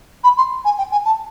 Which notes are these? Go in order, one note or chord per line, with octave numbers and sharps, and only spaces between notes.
B5
C6
G#5
G5
G#5
A5